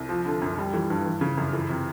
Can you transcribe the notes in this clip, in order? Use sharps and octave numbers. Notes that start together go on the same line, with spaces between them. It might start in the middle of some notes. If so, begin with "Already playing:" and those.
Already playing: C2
F3
D3
F#2
G3
E3
G2
E3
C#3
F#2
E3
C3